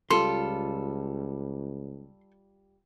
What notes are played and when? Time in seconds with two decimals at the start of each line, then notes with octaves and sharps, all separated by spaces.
0.11 C#2 G3 F4 A4 C6